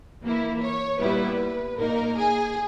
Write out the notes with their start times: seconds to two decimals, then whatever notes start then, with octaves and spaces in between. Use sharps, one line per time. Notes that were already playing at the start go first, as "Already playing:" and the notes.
0.23 E3 A#3 E4
0.61 C#5
1.00 A#2 G3 B3 E4 B4
1.77 A#2 A#3 D#4 A#4
2.16 G#4